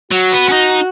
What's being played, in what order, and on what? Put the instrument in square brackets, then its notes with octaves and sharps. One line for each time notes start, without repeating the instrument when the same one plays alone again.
[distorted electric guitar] F#3 [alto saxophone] F#4
[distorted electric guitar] B3
C#4
D#4